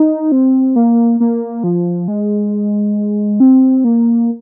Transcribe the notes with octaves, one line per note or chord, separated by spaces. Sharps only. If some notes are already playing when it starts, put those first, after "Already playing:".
Already playing: D#4
C4
A#3
A#3
F3
G#3
C4
A#3